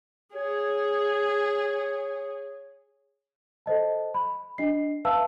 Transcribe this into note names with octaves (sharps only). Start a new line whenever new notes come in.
G#4 C#5
A4 C5 D#5 A5
B5
D4 D#5 C7
B4 E5 F5 A5 E6